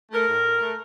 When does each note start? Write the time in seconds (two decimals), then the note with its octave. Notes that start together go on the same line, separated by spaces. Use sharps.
0.12 A3 A#4
0.28 A2
0.45 A2
0.61 A3